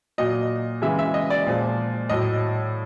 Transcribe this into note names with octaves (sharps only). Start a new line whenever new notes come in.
A#2 F#3 D#5
C#3 E3 G#3 E5
E5
D#5
D5
A#2 F3 G#3
A2 F#3 D#5